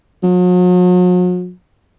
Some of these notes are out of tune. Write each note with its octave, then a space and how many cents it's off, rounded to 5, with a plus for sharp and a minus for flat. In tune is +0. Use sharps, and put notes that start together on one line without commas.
F#3 -45